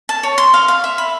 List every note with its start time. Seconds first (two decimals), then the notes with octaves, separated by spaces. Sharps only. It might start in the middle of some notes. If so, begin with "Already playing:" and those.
0.09 A5
0.23 C#5
0.38 C6
0.54 F5
0.68 F5
0.84 E5
0.98 B5